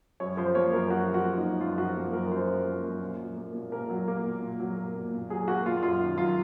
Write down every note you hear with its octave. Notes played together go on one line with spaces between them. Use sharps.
F#2 C#5
F3 C5
A#3 C#5
F#2 A#4
F#2 F#4
F3
F#4
A#3
D#4
F#2
F#2 F4
F3 F#4
A#3
F#2 A#4
F#2 C5
F3
A#3
F#2
A#2
F#3
A#3
A#2
A#2 A#4
F#3
A#3
A#2
A#2
F#3
A#3
A#2
A#2
F#3 G#4
A#3 F#4
A#2 F4
F#2 F4
D#3
F#3 F4